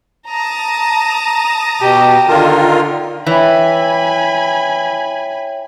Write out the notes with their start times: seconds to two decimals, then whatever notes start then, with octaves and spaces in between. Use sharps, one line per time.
0.32 A5 A#5 D#6
1.81 B2 G4
2.29 D3 D#3 F4 A#4
3.27 E3 C#5 E5 G5 G#5 B5